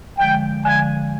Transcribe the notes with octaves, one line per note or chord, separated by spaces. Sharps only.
D3 F3 G#3 G5
D3 F3 G#3 G#5